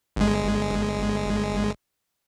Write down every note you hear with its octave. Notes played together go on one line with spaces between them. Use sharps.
G1 G#3